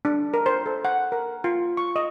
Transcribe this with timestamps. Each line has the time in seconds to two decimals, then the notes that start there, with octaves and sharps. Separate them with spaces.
0.05 D4
0.34 A#4
0.46 C5
0.66 A4
0.85 F#5
1.12 A#4
1.44 F4
1.77 C#6
1.96 D#5